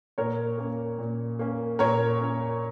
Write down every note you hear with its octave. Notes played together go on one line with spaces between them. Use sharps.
A#2 A#4 C#5
A#3 C#4
A#2
A#3 C#4
A#2 A#4 C#5
A#3 C#4